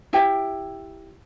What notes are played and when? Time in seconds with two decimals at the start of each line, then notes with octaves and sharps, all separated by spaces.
0.13 E4 G4 E5 G5